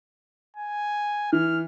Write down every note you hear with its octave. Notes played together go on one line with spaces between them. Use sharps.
G#5
E3 F6